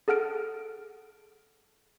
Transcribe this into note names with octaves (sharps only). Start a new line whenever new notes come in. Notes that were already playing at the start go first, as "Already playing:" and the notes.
G#4 A4 F#5 F6 D7